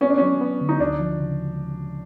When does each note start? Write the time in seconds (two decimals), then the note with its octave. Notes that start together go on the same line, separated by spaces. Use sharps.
0.01 B3 C#4
0.10 D4
0.18 F#3 C#4
0.41 B3
0.61 D3
0.69 D#4
0.80 D2 D4
0.99 F3
1.20 C#3